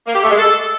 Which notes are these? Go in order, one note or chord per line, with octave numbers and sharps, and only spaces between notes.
A#3
G4
A3
G#3
A4